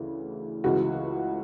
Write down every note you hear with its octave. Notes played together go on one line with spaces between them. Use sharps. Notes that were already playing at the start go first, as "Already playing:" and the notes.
Already playing: D2 C#3 E3
C#2 C#3 E3 F#4